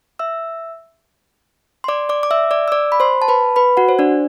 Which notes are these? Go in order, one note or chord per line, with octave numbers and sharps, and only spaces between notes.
E5 E6
C6
D5 D6
D5 D6
D6
E5 E6
D5 D6
E6
D5 D6
B5
C5 C6
A5
B4 B5
B4 B5
F#4 F#5
C5
D4 D5